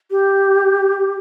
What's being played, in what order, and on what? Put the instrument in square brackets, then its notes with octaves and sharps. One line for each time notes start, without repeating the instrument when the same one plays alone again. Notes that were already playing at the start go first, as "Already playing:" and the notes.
[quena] G4